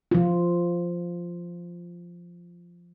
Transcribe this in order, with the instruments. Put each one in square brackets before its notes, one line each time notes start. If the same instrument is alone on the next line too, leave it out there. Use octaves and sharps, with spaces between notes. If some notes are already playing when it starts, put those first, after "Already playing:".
[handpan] F3 F4